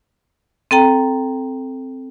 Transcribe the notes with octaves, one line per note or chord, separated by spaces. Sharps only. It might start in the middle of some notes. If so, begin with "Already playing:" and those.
C4 A4 G5 A#5